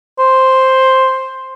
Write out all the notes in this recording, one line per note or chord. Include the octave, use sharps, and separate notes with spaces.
C5